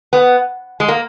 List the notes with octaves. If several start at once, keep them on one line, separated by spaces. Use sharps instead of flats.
B3
G#3
A#3